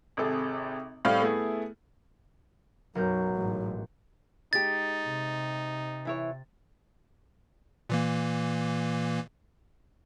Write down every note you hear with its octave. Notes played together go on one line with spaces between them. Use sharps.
G#1 C3 G#4 A4
A2 G3 C4 F5 G5
A3 B3 E4 G#4
B1 F#2 F#3 A#4 G6
A1 G#2
G#3 D#4 G4 A6
C3
E3 E4 C#5
A#2 E3 A#3